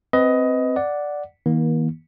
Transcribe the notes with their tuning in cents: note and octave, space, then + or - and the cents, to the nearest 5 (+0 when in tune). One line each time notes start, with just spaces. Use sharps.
C4 +0 B4 +15 D#5 +15
D5 +0 F#5 +0
D#3 +45 A#3 +35